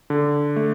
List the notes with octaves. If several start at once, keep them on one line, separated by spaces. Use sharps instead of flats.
D3
A3